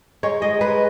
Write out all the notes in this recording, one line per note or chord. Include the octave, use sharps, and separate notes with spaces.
G#3 C#5
G#3 D#5
G#3 B4